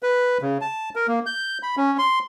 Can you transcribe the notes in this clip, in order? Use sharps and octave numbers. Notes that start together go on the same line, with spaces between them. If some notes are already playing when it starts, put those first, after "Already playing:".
B4
C#3
A5
A#4
A#3
G6
B5
C#4
C6